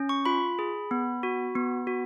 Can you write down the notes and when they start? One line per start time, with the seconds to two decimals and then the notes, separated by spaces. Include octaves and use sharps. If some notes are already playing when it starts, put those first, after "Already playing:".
Already playing: C#4
0.09 C#6
0.25 F4 B5
0.59 G#4
0.91 B3
1.23 F#4
1.55 B3
1.87 F#4